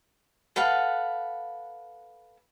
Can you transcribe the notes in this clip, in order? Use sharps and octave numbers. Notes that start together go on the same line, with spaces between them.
A4 B4 F5 F#5